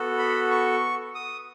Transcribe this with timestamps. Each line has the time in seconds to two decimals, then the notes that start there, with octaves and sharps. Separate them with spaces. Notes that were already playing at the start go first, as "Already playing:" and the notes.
Already playing: B3 F#4 A4
0.18 B5
0.50 C#6
1.15 D#6